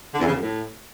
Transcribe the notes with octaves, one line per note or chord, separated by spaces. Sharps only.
D3
E2
C#3
F#2
A2